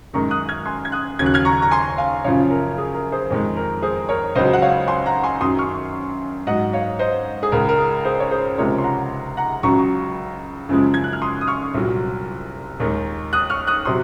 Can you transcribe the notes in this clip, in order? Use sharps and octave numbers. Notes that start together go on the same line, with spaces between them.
F#2 D#3 G#3 A#5 C#6
D#6 F#6
F6 G#6
G#5 C6
G#6
D#6 F#6
D#2 C#3 F#3 G#6
F#6
F6 G#6
A#5 C#6
A#5
G#5 C6
F5 G#5
F#2 C#3 F3 C#5 F5
A#4
G#4
A#4
G#4 C5
F2 D#3 G#3
A#4
G#4 C5
A#4 C#5
C#2 C#3 F#3 C5 D#5
F#5
C#5 F5
G#5 C6
F#5 A#5
G#5 C6
F#2 D#3 F#3 C6 D#6
C#6 F6
G#2 F#3 D#5 F#5
C#5 F5
C5 D#5
G#4
C#2 C#3 G#3 A#4
A#4
G#4
G#4 C5
C#5
G#4 C5
C#2 C3 F3 G#3 A#4 C#5
C6
F#5 A#5
F#5 A#5
C#2 C#3 F#3 A#5 C#6
F#2 C#3 F3 G#3
G#6
F#6
F6
C6 D#6
D#6
C#6 F6
C2 A#2 F#3
D#2 D#3 G#3
D#6 F#6
C#6 F6
D#6 F#6
C3 F#3 C6 D#6